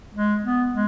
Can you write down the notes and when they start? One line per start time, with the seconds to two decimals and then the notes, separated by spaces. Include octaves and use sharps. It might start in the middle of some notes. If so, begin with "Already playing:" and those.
0.15 G#3
0.43 B3
0.73 G#3